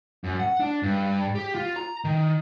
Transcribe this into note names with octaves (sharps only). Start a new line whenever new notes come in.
F#2
F#5
D4
G2
G4
F4
A#5
D#3